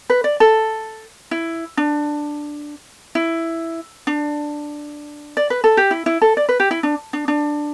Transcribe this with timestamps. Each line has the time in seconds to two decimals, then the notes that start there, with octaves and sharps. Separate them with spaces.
0.10 B4
0.24 D5
0.40 A4
1.31 E4
1.77 D4
3.15 E4
4.07 D4
5.37 D5
5.50 B4
5.64 A4
5.77 G4
5.91 E4
6.06 E4
6.22 A4
6.37 D5
6.49 B4
6.60 G4
6.71 E4
6.83 D4
7.13 D4
7.28 D4